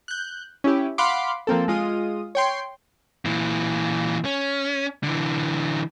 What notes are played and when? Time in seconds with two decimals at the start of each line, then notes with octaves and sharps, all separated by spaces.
0.08 F#6 G6
0.64 C#4 E4 G4
0.98 F5 F#5 B5 C6 D6
1.47 F3 A#3 C4 A4
1.68 G#3 F4 D#6
2.35 C#5 G5 C6
3.25 A#2 E3
4.25 C#4
5.03 D3 E3